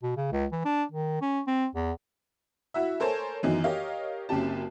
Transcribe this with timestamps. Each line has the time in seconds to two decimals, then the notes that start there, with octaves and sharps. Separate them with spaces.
0.03 B2
0.17 C#3
0.32 C#2
0.52 E3
0.65 D4
0.92 D#3
1.22 C#4
1.47 C4
1.75 E2
2.74 E4 F#4 E5
3.00 A4 A#4 C5 C#5 G#5 A5
3.43 F#2 D#3 E3 B3 D#4
3.64 G4 A#4 C#5 D#5 F5
4.29 F#1 F#2 C4 C#4 G4 A5